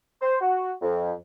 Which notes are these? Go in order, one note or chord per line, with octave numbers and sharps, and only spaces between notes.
C5
F#4
F2